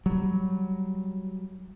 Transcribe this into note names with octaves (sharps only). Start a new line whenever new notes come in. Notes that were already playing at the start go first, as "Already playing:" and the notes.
F#3 G3